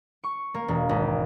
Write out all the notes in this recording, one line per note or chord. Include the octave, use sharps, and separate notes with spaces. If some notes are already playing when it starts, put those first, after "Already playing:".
C#6
A#3
E1
G#1